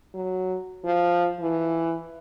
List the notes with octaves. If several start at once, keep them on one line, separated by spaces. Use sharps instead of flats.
F#3
F3
E3